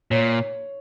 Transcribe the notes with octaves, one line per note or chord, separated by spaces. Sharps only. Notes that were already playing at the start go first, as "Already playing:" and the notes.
A#2 C#5